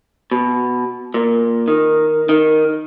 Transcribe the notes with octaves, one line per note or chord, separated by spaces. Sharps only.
B2
A#2
D#3
D#3